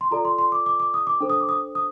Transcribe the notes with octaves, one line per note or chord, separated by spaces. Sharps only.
C6
F4 A4 D5 A#5
C6
C6
D6
D6
D6
D#6
D6
D4 A4 C5
D#6
D6
D#6
D#6